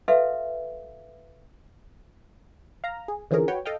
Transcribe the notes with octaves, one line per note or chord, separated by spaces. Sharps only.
F#4 A4 B4 E5 F5
F5 A#5
G#4
D3 E3 F3 C#4 G#4 A#4
F#4 B4 C#5 G5
A4 D#5 F5 G5